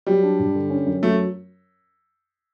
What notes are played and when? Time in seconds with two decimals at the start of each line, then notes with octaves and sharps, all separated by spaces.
0.06 F#3 G3
0.23 D4
0.39 G2
0.55 D3
0.70 C#4
0.86 F#2
1.02 F#3 A3